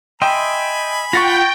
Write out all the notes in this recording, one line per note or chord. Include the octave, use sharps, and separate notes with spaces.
D#5 E5 G5 G#5 B5 C6
F4 F#5 G5 C#6 A6 A#6